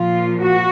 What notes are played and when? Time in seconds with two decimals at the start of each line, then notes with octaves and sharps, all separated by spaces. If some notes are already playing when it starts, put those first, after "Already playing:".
Already playing: A#2 F3 F4
0.39 F#4